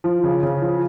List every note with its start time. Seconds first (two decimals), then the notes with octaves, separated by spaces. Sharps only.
0.04 F3
0.23 C#3
0.43 C#3
0.61 F3